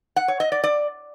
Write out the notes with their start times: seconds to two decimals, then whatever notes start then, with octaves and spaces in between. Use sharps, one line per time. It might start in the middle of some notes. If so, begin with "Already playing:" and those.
0.16 F#5
0.28 C#5
0.40 D#5
0.52 D5
0.64 D5